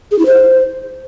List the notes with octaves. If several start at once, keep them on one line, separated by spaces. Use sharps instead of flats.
G#4
E4
C5